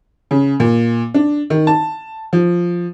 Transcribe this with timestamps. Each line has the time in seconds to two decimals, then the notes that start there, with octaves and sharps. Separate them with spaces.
0.31 C#3
0.60 A#2
1.14 D4
1.50 D#3
1.67 A5
2.33 F3